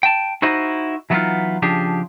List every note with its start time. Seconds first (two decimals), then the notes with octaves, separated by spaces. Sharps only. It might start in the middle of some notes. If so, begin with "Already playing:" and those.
0.03 G5 A5
0.42 D#4 E4 F#4 C5 D#5
1.10 E3 F#3 B3 C#4 D#4 F4
1.62 C#3 F3 D4 G4 G#4